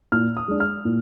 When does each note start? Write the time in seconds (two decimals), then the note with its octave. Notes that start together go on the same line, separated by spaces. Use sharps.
0.12 A#2 F6
0.37 D#6
0.48 G#3 D4
0.60 F6
0.85 A#2